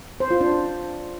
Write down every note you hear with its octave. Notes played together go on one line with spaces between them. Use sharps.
C5
F4
D4